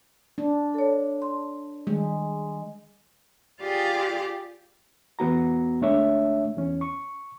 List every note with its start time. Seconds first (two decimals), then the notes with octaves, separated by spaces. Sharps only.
0.38 D4
0.74 A4 C#5
1.22 C6
1.87 D#3 G3 G#3
3.60 F4 G4 G#4 D5 F5
5.19 E2 B3 F#4 A#5
5.81 D2 G#3 A3 D4 C#5 E5
6.56 E2 C#4
6.81 C#6